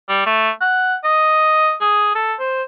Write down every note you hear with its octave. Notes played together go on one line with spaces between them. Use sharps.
G3
A3
F#5
D#5
G#4
A4
C5